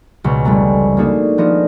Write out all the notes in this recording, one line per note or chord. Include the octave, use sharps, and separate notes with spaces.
C#2 B2
F1 G3 A3 B3 A#5
A#3 D4 D#4 F#4 G#4 A4
F3 B3 D4 A#4 D#5